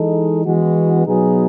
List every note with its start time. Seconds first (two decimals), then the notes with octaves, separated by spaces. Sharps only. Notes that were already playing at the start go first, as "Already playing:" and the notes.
Already playing: E3 G#3 D#4 A4
0.46 E3 G#3 B3 F#4
1.06 B2 F#3 B3 D#4 G#4